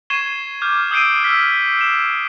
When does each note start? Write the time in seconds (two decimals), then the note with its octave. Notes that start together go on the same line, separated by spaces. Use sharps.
0.10 C#6 G#6 C7 D#7 E7 G7
0.62 D6 F6 G6
0.91 D#6 E6 G6 C7 D7 D#7
1.24 E6 F6 B6
1.81 E7